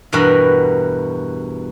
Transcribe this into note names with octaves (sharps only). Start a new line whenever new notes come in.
E2 G2 B2 F#4 A#4 B5